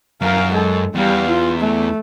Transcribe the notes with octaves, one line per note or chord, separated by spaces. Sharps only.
F#2 A#4 F5
G#3 A4
E2 G3 F5
F4
A3